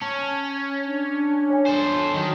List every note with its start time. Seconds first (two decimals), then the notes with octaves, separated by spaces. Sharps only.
0.01 C#4 A5
0.87 D4
1.50 C#5 G#5
1.66 A4 C5
2.15 D#3 F#3